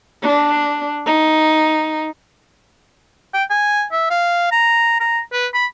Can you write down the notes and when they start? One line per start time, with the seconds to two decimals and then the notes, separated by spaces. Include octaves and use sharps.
0.22 D4
1.06 D#4
3.34 G5
3.50 G#5
3.92 E5
4.10 F5
4.52 A#5
5.00 A#5
5.32 B4
5.54 B5